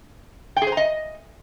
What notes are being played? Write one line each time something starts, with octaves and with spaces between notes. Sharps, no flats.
G5
G#4
C5
A#5
D#5